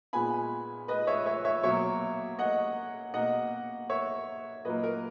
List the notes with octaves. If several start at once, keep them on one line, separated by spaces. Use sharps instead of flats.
A#2 G#3 B3 G#5 B5
B4 D#5
C#5 E5
C#5 E5
C#5 E5
B2 F#3 A#3 C#5 E5
D#5 F#5
B2 A#3 D#5 F#5
C#5 E5
A#2 F#3 A#3 B4 D#5
A#4